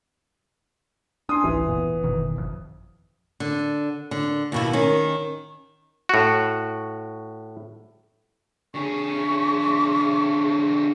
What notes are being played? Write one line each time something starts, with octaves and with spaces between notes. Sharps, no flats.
D4 G#5 C6 D#6
G#1 C#2 E3
F1 A#2 B3
F#1 B2 D#3
G#1 F2
D3
D3
D#2 B2 E4
D#3 C#4
A2 F#4
D3 G#4 C#6